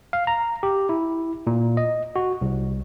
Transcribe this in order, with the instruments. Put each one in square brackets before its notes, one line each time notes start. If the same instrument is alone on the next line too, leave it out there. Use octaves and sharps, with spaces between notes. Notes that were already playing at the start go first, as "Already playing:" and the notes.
[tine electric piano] F5
A#5
G4
E4
A#2
D#5
F#4
C2